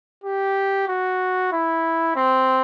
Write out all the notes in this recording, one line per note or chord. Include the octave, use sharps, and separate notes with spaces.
G4
F#4
E4
C4